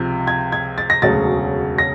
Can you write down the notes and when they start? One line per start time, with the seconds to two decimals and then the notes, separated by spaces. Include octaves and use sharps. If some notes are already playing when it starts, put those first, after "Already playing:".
Already playing: C#2 C3 F3
0.27 G#6
0.52 G#6
0.78 A6
0.90 A#6
1.02 E1 D2 C#3 F#3 A6
1.78 A#6